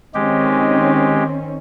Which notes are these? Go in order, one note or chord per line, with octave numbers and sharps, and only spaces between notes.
D#3 G#3 C4 C#4 G4